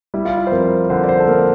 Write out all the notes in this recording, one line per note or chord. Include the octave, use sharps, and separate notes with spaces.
G3 E4
F4
E4
C5
F2 A#4
D3 C5
D5
C5
A4
A#3 A#4